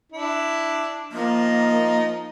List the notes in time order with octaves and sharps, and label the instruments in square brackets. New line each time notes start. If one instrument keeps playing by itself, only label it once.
[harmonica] D4 E4
[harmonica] F3 D#4 D#5 [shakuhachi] A#3